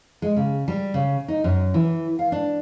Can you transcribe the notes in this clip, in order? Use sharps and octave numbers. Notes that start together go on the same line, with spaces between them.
G#3
C#3
G3
C#3
D#4
F#2
E3
F5
D4